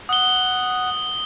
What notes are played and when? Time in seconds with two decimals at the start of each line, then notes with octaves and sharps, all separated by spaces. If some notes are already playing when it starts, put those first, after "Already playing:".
0.09 F#5 D#6 G7